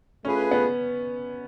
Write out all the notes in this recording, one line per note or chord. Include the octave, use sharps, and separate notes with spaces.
A3 C#4 F4 G#4 B4
B3